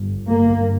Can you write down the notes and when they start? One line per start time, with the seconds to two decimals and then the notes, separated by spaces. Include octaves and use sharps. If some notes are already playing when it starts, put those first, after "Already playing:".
Already playing: G1
0.29 G1 G2 A#3